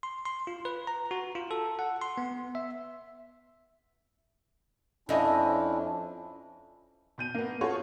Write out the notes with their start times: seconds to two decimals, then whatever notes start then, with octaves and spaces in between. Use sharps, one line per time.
0.03 C6
0.25 C6
0.47 F4
0.65 B4
0.87 A#5
1.11 F#4
1.35 F4
1.51 A4
1.79 F#5
2.02 C6
2.18 B3
2.55 E5
5.09 F2 C#4 D4 E4 D#5
7.18 B2 G6 D#7
7.34 A#3 B3
7.61 C#4 F4 F#4 G#4 A4 C#5